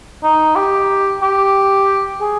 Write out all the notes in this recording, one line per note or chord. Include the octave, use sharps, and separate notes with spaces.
D#4
G4
G4
G#4